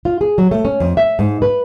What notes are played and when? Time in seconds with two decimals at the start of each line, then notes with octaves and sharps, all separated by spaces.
0.05 F4
0.21 G#4
0.38 F#3
0.51 A3
0.65 C#4
0.80 F2
0.97 E5
1.19 G#2
1.42 B4